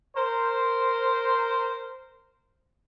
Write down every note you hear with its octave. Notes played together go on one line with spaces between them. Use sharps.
A#4 C5